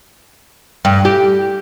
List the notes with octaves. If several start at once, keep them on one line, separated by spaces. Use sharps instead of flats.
G2
G4